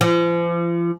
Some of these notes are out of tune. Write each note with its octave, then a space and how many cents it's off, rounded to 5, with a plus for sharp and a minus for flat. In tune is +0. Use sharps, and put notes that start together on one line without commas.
F3 -40